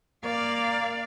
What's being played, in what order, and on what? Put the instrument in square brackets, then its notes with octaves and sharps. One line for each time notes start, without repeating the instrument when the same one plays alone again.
[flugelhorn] A#3 [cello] D5 F5